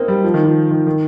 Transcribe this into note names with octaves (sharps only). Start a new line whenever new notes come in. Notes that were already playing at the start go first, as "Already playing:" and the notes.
Already playing: A#3 C4 D#4
G3
F3
D#3
F3
D#3
D#3